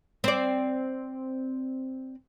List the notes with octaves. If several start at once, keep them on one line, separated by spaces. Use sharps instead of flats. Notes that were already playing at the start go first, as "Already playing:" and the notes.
C4 D5